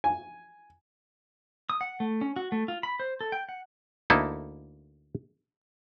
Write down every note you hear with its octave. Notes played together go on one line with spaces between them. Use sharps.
G#5
D#6
F#5
A3
C#4
F#4
A3
F4
B5
C5
A4
G5
F#5
D2 A#3 D#4 E4 A4